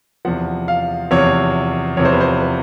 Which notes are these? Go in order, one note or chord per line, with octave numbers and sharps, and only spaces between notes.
E2 C3 F3 F#5
F5
E2 C3 F3 C#5
E2 C3 F3 C#5
C5
B4
C5
B4